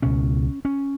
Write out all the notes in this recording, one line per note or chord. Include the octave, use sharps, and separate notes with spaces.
C#2 B2 C#4
C#4